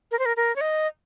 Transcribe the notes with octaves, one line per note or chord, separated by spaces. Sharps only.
A#4
C5
A#4
A#4
C#5
D#5